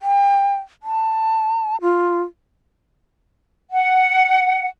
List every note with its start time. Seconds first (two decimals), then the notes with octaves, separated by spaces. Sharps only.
0.01 G5
0.83 A5
1.82 F4
3.71 F#5